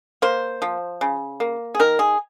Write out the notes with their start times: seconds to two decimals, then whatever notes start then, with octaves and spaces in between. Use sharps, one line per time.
0.22 A#3 C5
0.62 F3
1.01 C#3
1.40 A#3
1.75 G#4
1.79 D#3 A#4
1.99 G#4